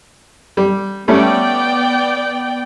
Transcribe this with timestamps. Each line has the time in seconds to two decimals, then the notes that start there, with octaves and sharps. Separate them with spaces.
0.57 G3
1.08 G3 A3 B3 C#4 D5 G5